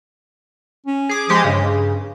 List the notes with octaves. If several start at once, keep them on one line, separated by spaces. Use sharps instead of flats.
C#4
G#4 D6
F3 G#3 G4 D#6
G2 C#3